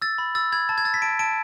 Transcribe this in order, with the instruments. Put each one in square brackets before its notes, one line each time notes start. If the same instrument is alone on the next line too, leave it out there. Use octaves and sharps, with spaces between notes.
[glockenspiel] E6 A6
B5
E6 A6
B5 G#6
A5 A6
G#6
E6 A6
B6
A5 D7
A5 D7